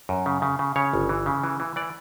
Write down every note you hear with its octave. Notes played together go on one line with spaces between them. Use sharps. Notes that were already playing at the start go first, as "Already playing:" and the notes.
F#2
C#3
C#3
C#3
C#3 C#5
G1
E3
C#3
E3
E3
E3 D5